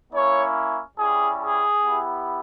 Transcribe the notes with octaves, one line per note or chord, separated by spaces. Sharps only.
A#3 C#4 E4 C#5
G3 C#4 E4 G#4
G#4
B3 E4 G4